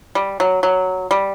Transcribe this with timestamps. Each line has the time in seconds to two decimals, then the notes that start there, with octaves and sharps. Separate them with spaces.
0.15 G3
0.40 F#3
0.63 F#3
1.11 G3